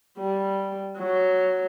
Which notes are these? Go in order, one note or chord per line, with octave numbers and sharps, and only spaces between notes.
G3
F#3